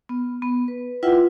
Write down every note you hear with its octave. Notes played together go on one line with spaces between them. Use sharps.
B3
B3
B4
E4 F4 B4 E5 F#5 G5